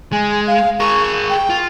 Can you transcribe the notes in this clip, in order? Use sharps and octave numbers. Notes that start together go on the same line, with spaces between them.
G#3 G#5
F5
G#4 A#4 C#6
G5
F4